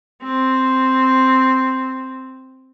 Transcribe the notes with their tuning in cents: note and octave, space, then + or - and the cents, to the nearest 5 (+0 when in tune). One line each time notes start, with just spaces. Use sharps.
C4 +0